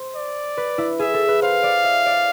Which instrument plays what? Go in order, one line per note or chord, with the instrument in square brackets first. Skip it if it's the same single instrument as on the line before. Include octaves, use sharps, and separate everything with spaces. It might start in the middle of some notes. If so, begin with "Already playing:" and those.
Already playing: [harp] C5
[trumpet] D5
[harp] B4
E4
[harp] G#4 [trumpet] E5
[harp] A4
B4
[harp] C5 [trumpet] F5
[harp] D5
E5
D5